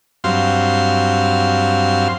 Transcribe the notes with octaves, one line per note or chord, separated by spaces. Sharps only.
G2 F#3 C4 F5 C6